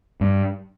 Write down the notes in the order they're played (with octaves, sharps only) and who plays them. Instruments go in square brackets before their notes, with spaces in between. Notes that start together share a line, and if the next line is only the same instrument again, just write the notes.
[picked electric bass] G2